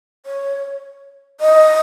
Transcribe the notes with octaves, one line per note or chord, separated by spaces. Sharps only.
C#5
D#5